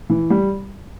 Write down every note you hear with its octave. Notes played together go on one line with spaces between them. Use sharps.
E3
G3